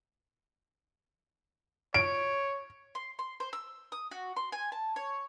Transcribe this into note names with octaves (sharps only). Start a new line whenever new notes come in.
C#5 D7
C6
C6
C5
E6
D#6
F#4
C6
G#5
A5
C#5